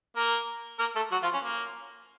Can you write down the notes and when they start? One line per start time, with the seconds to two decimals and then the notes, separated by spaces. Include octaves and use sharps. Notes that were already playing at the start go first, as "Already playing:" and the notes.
0.16 A#3 A#4
0.79 A#3 A#4
0.96 A3 A4
1.12 F#3 F#4
1.23 F3 F4
1.34 C#4
1.44 A#3